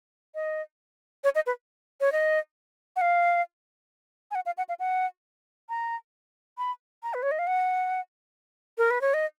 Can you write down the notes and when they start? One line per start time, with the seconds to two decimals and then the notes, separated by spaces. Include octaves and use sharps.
0.35 D#5
1.24 C#5
1.35 D#5
1.46 B4
2.01 C#5
2.12 D#5
2.96 F#5
3.01 F5
4.31 G#5
4.35 F#5
4.46 F5
4.58 F#5
4.69 F5
4.79 F#5
5.69 A#5
6.58 B5
7.03 A#5
7.14 B4
7.23 C#5
7.31 D#5
7.39 F5
7.47 F#5
8.78 A#4
8.91 B4
9.01 C#5
9.14 D#5